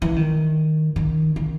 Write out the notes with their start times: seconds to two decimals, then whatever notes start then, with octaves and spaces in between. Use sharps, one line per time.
0.02 E3
0.16 D#3
0.96 D#3
1.36 D#3